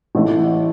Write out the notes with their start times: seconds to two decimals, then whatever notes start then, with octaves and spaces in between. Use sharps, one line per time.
0.15 A1 A2 E3 A3